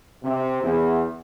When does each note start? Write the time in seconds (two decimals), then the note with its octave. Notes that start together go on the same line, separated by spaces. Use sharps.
0.24 C3
0.62 E2